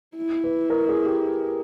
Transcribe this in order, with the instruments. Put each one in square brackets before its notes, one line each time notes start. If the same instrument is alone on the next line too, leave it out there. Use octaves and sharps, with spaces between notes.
[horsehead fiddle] E4
[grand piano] B4
A#4
G#4
G4